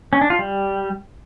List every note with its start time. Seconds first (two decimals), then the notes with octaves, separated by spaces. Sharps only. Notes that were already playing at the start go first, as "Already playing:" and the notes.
0.13 C#4
0.21 D4
0.30 F4
0.39 G3